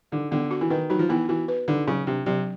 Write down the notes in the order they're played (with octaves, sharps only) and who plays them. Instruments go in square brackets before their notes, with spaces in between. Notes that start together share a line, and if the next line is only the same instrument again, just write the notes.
[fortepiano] D3 [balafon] D#4
[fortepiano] D3 [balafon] B3
[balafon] F#4
[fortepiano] E3
[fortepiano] D#3 [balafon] B4
[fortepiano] F#3 [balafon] D#4
[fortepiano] F3
[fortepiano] E3 [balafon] B3
[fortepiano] E3 [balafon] F#4
[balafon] B4
[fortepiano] D3 [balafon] D#4
[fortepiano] C#3 [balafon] F#3
[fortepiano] C3 [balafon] D4
[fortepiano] C3 [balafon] F#3